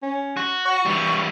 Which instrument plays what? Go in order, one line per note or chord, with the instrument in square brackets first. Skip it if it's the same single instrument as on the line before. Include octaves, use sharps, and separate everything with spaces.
[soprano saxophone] C#4
[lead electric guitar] F#4
[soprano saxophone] C#6
[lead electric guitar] E3 G3